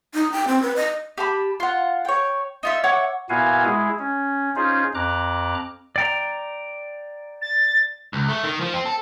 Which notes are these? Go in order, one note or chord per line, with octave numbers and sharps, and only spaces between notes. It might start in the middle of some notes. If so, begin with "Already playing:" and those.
D#4
G5
C4
B4
D#5
G4 A5 B5
F4 F#5
C#5 G5
D#4 F4 E5
C#5 E5 F#5 D6
A#2 B3 E4 F#4 F5 G#5
G#3 E4 G#4
C#4
C#4 D#4 F4 G#4 C5
F2 A#5 D6 F#6
D5 G5 A#5
A6
C#2
A3
D#3
F3
C4
A4